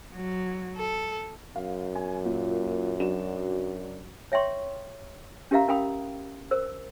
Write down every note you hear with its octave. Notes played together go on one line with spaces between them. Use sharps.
F#3
A4
F#2 F5
G#5
A#2
F#3 D4 E7
C#5 E5 G5 C6 C#6
C#4 G4 A#4 E5 F5 A#5
C#4 A#4 F5 G5 B5 D#6
A#4 C5 E6